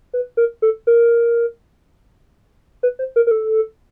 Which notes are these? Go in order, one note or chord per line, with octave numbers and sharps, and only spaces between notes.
B4
A#4
A4
A#4
B4
C5
A#4
A#4
A4